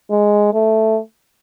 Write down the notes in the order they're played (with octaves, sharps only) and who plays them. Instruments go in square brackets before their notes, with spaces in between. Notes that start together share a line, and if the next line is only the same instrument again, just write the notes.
[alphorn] G#3
A3